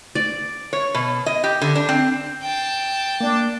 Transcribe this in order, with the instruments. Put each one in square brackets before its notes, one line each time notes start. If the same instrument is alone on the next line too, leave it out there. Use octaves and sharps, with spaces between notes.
[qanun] D5
[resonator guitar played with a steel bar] C#5
B2
D#5
G4
D3
D4
C4
[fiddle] G5 A5
[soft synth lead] A#3 [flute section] D4